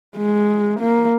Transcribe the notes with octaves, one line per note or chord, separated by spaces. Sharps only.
G#3
A#3